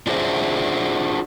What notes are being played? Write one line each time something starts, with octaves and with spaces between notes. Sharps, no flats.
D4 F4 F#4 G#4 C5 E5